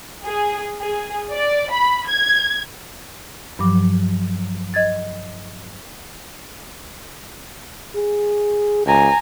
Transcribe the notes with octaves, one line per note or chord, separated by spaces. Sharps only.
G#4
G#4
D5
B5
G#6
G2 F3 F#3 D6
D#5 G#6 A6
G#4
C#2 G#5 A#5